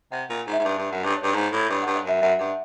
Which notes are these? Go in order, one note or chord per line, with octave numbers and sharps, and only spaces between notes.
C3 F#5
A#2
G#2
E5
G#2
G2 F5
G2
F#2
G2
C#5
G2
G#2
A2
G2 C#5
F#5
G2
F5
F#2 E5
F#2 E5
G2 F#5